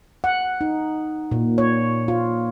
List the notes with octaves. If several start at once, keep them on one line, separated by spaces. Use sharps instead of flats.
F#5
D#4
A#2
C#5
F4